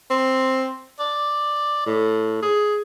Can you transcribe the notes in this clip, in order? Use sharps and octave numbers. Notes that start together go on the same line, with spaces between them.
C4
D5
A2
G#4